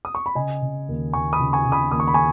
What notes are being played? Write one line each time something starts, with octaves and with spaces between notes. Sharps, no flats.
D#6
C#6
B5
C#3 D#5 G#5
C#3
D#2
D#2 G#5 C#6
B5 D#6
C#3
G#5 C#6
C#3
B5 D#6
D#2 D#6
C#6
B5
G#5 C#6